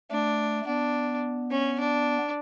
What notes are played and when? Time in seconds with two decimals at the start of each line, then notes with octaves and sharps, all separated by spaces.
0.11 A3 D4
0.67 B3 D4
1.51 C#4
1.80 D4